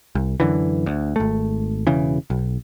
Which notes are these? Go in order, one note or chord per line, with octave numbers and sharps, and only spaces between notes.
C2
F#2 D3 E3
D2
G#1 A3
E1 C#3 E3
B1